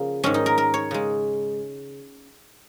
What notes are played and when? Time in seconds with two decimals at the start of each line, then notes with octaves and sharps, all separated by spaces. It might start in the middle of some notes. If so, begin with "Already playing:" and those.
Already playing: C#3 F3 A#3
0.23 G#2 D#3 G#3 C#4
0.34 D#4
0.46 A#4
0.58 A#4
0.74 C#5
0.91 C#3 G#3